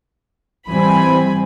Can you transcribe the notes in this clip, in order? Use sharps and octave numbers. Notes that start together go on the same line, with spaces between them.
E3 G3 C4 G#5 B5